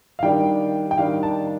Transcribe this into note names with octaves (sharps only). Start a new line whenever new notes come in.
F5
D#3 G3 D4 G5
G5
D#3 G3 D4 F5
A5